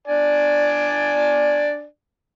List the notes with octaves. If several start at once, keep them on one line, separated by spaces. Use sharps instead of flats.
D4 D5 G#5